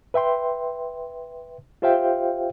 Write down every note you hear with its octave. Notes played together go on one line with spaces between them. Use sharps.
B4 E5 G5 C6
F4 G4 C5 E5 F5 G5